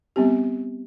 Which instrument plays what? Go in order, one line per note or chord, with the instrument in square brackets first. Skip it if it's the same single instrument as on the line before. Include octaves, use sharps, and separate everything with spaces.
[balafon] G3 B3 C4 G4